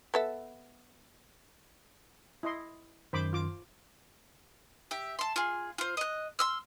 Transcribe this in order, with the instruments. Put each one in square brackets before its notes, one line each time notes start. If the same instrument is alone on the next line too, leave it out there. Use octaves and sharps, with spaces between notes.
[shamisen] B3 A4 E5
[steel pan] E4 D#5 C6
[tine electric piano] F#2 D#3 [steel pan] C5 B5 D6
[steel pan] F4 D6
[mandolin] G4 E5
A5 C6
F4 G#4
F4 C5
D#5 F#6
C6 E6 F6